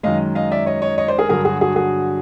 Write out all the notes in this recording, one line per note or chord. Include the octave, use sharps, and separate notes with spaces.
F#2 D#3 G#3 D#5 F5
D#5 F5
D5 E5
C#5 D#5
C#5 D#5
C#5 D#5
C5 D5
G#4 A#4
G2 D3 F#3 G#4 A#4
F#4 G#4
F#4 G#4
F#4 G#4